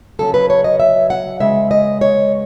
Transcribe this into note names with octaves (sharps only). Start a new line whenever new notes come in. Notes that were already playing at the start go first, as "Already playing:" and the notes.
C#3 F#3 C#4 A4
B4
C#5
D#5
E5
F#5
C#3 G#3 B3 E5
D#5
C#5